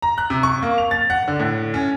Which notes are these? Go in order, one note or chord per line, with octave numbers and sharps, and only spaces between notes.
A#5
F#6
C3
C#6
A#3
F7
A6
F#5
D3
A2
C#4